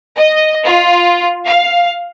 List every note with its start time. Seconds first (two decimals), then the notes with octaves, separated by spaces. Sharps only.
0.16 D#5
0.66 F4
1.45 F5